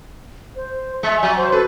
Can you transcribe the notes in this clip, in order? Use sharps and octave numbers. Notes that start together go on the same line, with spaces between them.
C5
G#3 E5
F#3 G#5
C5
A4 B4